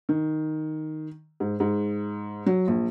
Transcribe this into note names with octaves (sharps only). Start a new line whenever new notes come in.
D#3
G#2
G#2
F#3
A#1